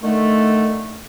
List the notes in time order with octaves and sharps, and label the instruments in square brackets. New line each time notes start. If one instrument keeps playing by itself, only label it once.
[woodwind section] D3 D#3 A3